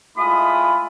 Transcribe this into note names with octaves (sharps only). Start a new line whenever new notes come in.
G#3 A3 E4 F4 B5 D#6